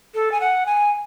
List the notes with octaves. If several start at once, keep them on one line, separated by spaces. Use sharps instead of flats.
A4
G#5
F#5
G#5